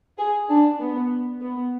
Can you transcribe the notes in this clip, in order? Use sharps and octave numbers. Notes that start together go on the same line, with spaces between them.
G#4
D4
B3
B3